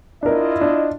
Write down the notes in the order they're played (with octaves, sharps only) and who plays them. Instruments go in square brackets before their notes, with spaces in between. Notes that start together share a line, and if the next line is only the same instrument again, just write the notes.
[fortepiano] D4 A#4 [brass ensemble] E4 F4 D#5
[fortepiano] D4